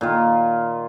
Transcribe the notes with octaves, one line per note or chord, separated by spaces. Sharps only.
A#2 D#3 F4